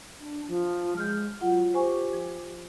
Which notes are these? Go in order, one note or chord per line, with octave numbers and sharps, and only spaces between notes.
D4
F3
G#3 F6 G6
F#3 F4 F#5
G4 C5 G#5 C#6
F3